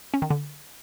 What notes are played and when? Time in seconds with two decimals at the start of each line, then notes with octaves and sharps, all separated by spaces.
0.14 C#4
0.22 D#3
0.30 D3